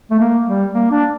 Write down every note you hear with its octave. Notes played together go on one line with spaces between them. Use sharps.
A3
A#3
G3
A#3
D4